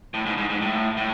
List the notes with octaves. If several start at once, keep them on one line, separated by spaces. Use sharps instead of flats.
A2
G#2
G#2
G#2
A2
A2